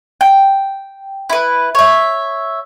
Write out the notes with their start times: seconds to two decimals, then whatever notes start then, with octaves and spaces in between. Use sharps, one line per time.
0.21 G5
1.30 E4 B4
1.75 C#5 E5